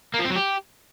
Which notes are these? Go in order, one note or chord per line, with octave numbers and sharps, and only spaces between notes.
A#3
F3
C4
F#3
G4